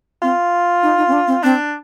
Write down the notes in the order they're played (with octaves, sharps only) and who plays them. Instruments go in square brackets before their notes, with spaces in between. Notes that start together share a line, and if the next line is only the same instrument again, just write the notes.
[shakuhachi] C4 [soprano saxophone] F4
[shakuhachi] D#4
D#4
C4
D4
C4
[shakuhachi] C4 [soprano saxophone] D4